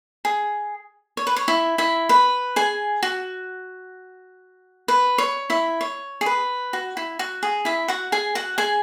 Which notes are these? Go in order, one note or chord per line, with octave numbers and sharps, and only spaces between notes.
G#4
C#5
B4
C#5
E4 E5
E4 E5
B4 B5
G#4 G#5
F#4
B4
C#5
E4 E5
C#5
G#4
B4
F#4
E4
F#4
G#4
E4 E5
F#4 F#5
G#4 G#5
F#4 F#5
G#4 G#5